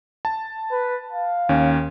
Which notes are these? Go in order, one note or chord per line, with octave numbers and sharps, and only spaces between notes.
A5
B4
F5
D#2 C#4